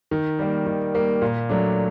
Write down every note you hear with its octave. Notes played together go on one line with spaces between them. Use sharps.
D#3
G3 A#3
D#3
G3 A#3
A#2
F#3 A3 D4